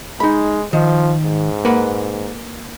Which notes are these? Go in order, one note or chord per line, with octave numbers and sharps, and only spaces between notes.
G#3 D#4 B5
D#3 F3
G#2
A#3 B4 F#5